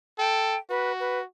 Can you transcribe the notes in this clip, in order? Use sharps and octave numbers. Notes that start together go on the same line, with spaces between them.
A4 G5
F#4 B4
B4